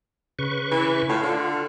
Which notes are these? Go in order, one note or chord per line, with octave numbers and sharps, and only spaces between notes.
C#3 B4 C#6
E3
A2 F4
D3